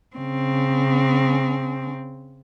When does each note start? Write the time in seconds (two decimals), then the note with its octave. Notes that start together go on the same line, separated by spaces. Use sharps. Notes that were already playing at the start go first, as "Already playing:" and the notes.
0.16 C#3 C4